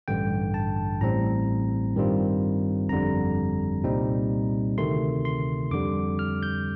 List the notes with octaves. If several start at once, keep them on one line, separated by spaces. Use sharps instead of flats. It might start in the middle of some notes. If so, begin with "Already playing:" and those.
A1 G2 D3 G5
A5
A1 A2 G3 C4 A#5
G2 D#3 G3 C4 F4
G1 F2 D3 G3 A#5
C2 A#2 G3 C4 D#4
D2 C3 D#3 A3 C6
C6
F2 D3 G3 D6
F6
G6